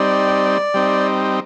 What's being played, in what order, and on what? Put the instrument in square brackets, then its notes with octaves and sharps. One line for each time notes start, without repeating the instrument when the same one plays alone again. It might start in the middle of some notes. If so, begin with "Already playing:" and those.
Already playing: [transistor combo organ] G3 C4 D#4 [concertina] D5
[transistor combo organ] G3 C4 D#4